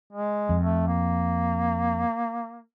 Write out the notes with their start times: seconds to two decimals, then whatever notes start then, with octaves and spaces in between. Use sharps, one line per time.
0.13 G#3
0.49 F2
0.63 A3
0.88 A#3